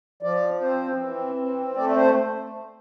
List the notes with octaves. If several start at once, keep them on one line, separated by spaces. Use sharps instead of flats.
F3 D5
C4 C5
E3
C4
A3 D5
D5
C5